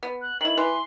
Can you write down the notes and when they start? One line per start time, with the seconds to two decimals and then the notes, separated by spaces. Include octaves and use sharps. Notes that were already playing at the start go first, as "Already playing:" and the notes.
0.03 B3
0.22 F#6
0.41 D#3 E4 F#7
0.57 E3 B4 C6